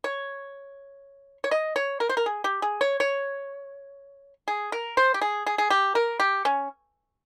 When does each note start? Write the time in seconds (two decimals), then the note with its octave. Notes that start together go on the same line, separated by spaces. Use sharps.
0.04 C#5
1.44 C#5
1.51 D#5
1.76 C#5
2.00 A#4
2.09 C5
2.17 A#4
2.26 G#4
2.44 G4
2.62 G#4
2.81 C#5
3.00 C#5
4.48 G#4
4.72 A#4
4.97 C5
5.14 G4
5.21 G#4
5.46 G#4
5.58 G#4
5.70 G4
5.95 A#4
6.20 G4
6.45 C#4